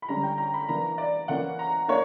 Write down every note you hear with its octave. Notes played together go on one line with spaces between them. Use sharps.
B5
D3 G3 C#4 A#5
G5
A#5
B5
E3 A#3 D4 A#5
D5
E3 A#3 C#4 F#5
A#5
A#3 D4 C#5